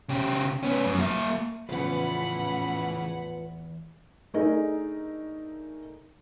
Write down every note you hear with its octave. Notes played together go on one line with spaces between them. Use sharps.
C#3 G4
B3 C#4
F#2
A#3 E5
E2 A2 C#3 E3 F3 B3 F#5 B5
A3 D4 D#4 G#4 A#4